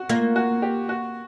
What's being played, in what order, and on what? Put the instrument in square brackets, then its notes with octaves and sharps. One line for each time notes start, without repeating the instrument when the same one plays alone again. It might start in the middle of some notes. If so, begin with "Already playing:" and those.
Already playing: [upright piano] F#4
[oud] A#3 [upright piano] F4
[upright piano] F#4
G4
F#4